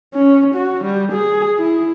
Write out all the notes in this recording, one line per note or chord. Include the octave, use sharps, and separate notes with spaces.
C#4
F#4
G3
G#4
E4